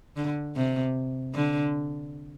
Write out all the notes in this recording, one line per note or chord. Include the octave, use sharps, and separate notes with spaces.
D3
C3
D3